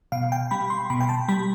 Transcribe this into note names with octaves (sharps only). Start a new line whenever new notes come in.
B2 F5
G5
G3 B5
C6
B2 B5
G5
A5
G3 B5